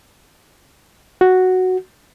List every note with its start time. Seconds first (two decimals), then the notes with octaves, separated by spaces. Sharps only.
1.21 F#4